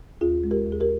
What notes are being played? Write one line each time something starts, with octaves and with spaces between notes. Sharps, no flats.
D#2 F4 G#4
G#3
G4 A#4
D#2
G#4
G4 A#4